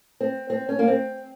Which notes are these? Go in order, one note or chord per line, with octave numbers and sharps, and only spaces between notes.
C4
C4
C#4
A#3
C4